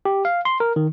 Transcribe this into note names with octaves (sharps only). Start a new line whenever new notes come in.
G4
F5
C6
A#4
D#3